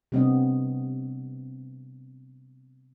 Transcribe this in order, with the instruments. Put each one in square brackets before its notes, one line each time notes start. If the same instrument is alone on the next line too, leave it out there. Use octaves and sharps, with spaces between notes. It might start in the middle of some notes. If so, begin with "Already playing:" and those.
[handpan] C3 G3 B3 C4 D4 D#5